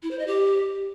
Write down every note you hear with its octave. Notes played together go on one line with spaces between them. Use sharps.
E4
C5
D#5
G4